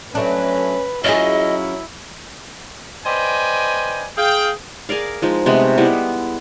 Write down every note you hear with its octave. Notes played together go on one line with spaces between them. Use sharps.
F#3 A3 C#4 D4 B4
F#3 C#4 E4 F4 G#4 D#5
B4 C5 D5 D#5 G5 G#5
G#4 F5 G5
G#4 A#4 D5 F5
F3 G#3 D#4
C3 G#3 A3 B3
G3 G#3 B3 E4